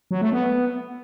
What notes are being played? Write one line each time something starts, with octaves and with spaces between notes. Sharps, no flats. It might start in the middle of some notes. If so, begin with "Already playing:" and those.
F#3
A3
B3